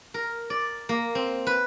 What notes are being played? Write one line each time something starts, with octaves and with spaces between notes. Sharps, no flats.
A#4
D5
A#3
C4
B4